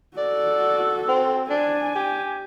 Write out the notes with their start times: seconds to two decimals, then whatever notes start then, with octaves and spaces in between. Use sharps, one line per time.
0.17 F#4 A4 D5
1.08 C4
1.50 D4 G#5
1.95 G4